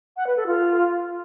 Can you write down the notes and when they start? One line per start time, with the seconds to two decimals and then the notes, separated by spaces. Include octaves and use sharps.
0.17 F#5
0.27 B4
0.37 A4
0.47 F4